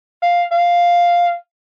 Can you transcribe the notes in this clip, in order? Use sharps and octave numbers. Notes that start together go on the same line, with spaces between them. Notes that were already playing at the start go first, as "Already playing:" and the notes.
F5
F5